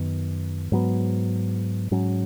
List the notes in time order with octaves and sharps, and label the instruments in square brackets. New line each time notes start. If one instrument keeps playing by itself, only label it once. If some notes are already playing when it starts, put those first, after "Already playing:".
Already playing: [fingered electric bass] F#2 D#3 B3
G#2 F#3 B3
G#2 F#3 C#4